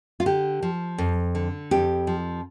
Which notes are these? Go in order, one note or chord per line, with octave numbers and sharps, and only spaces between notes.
F4
D3 G4
F3
F2
D3
F2 G4
F3